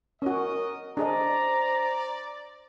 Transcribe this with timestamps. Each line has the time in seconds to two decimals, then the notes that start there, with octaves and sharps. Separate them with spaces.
0.22 C#4 F#4 A#4 D#5
0.97 D4 G#4 C5 D5 D#5 A#5